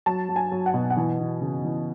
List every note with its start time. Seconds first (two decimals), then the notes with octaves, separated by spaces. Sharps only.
0.06 F#3 A5
0.29 F#3
0.36 G#5
0.52 F#3
0.66 F#5
0.74 B2
0.90 F#5
0.97 E3 G#5
1.20 E3
1.41 C#3
1.65 E3